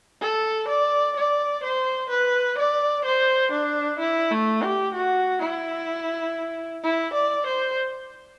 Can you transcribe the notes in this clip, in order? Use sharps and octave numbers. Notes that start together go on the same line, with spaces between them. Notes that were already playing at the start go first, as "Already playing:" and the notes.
A4
D5
D5
C5
B4
D5
C5
D4
E4
A3
G4
F#4
E4
E4
D5
C5